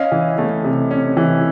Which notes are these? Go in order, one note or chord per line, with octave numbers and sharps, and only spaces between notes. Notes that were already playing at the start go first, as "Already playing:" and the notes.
Already playing: C#4 D#5 F5
E3
A3
C3
C#4
E3